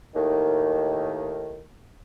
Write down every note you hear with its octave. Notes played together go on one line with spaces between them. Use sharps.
D#2 A2 D#3